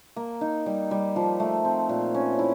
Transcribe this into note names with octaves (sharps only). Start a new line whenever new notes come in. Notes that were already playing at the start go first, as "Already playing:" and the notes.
A#3
D#4
G3
G3
F3
A3
C4
A#2
C#4
E4